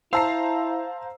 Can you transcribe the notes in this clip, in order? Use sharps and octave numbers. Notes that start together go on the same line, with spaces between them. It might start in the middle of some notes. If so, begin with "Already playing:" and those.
E4 C5 F5 A5 A#5 E6 C7